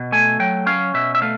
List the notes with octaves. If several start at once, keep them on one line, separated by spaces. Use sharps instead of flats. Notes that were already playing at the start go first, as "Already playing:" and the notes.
Already playing: B2
A3 G#5
F#3 G5
C#4 F5
B2 E5
E5
A3 F5